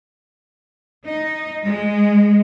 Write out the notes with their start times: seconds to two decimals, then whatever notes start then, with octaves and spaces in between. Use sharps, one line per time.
1.06 D#4
1.64 G#3